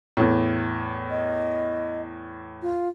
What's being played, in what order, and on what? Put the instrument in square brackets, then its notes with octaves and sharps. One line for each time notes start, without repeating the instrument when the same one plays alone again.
[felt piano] E2 A2
[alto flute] D#5
F4